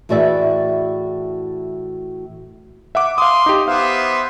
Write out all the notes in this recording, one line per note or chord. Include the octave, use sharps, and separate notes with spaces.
A2 E3 F#4 G#4 D5 E5
E5 F#5 D6
F5 C6 D#6
D#4 G4
B3 C5 E5 F5